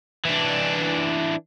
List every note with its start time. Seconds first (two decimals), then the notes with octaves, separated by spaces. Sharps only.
0.25 E3 D4